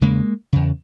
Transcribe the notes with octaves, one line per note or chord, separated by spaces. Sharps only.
E2 C#3 G#3 A#3
E2 C#3